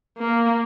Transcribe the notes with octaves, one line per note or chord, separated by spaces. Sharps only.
A#3